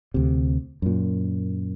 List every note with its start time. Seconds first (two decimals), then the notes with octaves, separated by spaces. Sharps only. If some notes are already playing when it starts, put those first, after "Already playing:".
0.14 D2 C3
0.82 F#2 A#2